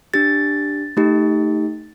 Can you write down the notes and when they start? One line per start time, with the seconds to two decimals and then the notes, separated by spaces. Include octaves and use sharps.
0.14 D4 G4 A6
0.97 A3 D#4 G4